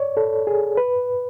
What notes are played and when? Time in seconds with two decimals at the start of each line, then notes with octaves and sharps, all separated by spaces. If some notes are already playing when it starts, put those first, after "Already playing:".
Already playing: C#5 D5
0.17 A4
0.47 G#4
0.77 B4